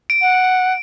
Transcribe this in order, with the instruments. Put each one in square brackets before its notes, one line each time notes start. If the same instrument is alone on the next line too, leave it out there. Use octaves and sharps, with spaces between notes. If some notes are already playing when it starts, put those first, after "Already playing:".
[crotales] D7
[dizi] F#5